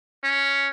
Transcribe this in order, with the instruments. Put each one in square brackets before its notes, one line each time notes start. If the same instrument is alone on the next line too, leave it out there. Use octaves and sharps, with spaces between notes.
[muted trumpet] C#4